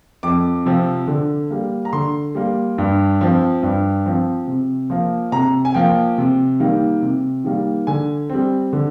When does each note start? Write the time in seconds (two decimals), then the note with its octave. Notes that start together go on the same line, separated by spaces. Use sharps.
0.23 F2 D6
0.66 C3 F3 C4
1.08 D3
1.50 G3 A#3
1.85 A#5
1.93 D3 C6
2.35 G3 A#3
2.78 G2
3.21 F3 C4
3.63 G2
4.06 F3 C4
4.47 C3
4.90 F3 A#3
5.32 C3 A#5
5.65 G#5
5.74 F3 A#3 G5
6.18 C3
6.60 D#3 G3 A#3
7.02 C3
7.44 D#3 G3 A#3
7.87 D3 G#5
8.30 G3 C4
8.73 D3